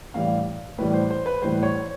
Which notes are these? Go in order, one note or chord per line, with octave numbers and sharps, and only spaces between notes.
A2 E3 G3 F5
A2 E3 G3 B4
C5
C5
B4
A2 E3 G3 C5
C#5